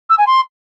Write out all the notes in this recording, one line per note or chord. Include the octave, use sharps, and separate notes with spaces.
E6
G#5
C6